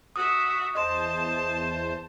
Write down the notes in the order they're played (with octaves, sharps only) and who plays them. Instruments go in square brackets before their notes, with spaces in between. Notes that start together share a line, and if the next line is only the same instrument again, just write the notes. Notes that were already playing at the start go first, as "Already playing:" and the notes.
[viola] F#4 E5 [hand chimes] D#6
[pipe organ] E2 C5 [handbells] D#5 C6 [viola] A5